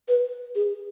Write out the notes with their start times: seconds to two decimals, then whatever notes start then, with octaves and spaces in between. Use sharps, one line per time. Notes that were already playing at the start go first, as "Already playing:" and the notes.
0.08 B4
0.55 G#4